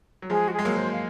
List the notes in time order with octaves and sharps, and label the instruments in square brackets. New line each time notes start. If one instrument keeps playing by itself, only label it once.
[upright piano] F#3
[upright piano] F3 G#3 [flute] G#4
[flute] F#4
G#4
[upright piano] G#3
F#3 A#3
[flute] C5
F5